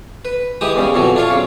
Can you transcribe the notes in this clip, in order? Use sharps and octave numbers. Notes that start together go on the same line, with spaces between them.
B4
E3 G#3 G4 D#6
E2 C#3 G3
F2 B2 E3 F#3
D4 F4 C#5
B1 C#3